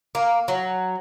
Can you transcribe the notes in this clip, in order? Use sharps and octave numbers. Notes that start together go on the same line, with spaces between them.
A#3
F#3